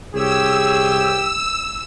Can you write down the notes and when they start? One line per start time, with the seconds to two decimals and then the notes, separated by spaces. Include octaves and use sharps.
0.14 C2 G4 G#4 C#5 E6